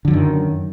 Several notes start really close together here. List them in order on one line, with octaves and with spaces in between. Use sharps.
D3 F3 F#2 D#3